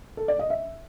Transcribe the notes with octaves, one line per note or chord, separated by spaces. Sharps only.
A4
D5
D#5
E5